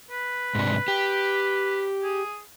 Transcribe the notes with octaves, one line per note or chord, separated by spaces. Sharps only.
B4
G#2 C3 D4
G4
G#4